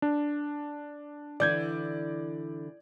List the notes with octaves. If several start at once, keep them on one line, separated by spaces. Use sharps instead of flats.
D4
D3 E3 D5 G6 G#6